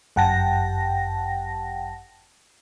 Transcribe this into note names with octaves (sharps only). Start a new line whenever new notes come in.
G1 F#2 F#5 G5 A5 A#6